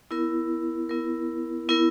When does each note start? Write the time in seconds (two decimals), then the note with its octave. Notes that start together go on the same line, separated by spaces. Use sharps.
0.11 B3 E4 A#4
0.89 B3 E4 A#4
1.69 B3 E4 A#4